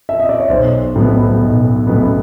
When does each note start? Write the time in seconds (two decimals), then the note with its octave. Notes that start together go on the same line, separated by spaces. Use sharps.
0.09 E5
0.20 D#5
0.29 D5
0.40 C#5
0.49 B1 C5
0.95 A2 F#3 B3
1.41 B1
1.87 A2 F#3 B3